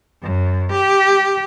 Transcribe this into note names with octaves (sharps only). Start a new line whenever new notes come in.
F#2
G4